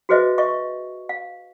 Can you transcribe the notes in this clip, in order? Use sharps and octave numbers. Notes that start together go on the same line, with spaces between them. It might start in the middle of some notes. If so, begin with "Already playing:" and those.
F#4 G#4 B4 C5 D#5 E5
D#5 E5 C#6
F5